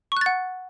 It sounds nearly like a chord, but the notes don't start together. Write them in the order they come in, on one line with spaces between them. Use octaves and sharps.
C#6 F#6 A6 F#5